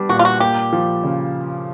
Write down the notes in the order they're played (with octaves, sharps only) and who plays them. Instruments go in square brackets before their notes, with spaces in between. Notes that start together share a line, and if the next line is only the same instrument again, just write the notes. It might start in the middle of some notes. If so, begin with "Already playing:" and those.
Already playing: [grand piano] G3 B3 D4
[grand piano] A#2 [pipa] F#4
[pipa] F4
F#4
[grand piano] A#3 [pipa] G4
[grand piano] F3
C#3